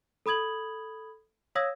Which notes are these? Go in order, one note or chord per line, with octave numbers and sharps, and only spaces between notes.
A4 B5 D#6 G#6 F#7
C#5 F5 D#6 E6 G#6 A#6